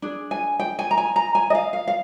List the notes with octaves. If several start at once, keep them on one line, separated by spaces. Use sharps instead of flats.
D4 G#4
G#5
G5
G#5
A#5
G#5
A#5
G#5
D#5
F5
F5
F5